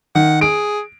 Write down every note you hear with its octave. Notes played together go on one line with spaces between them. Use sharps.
D#3 F#5
G#4 D7